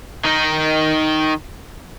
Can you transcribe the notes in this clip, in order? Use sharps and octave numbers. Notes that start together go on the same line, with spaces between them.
D#3 D#4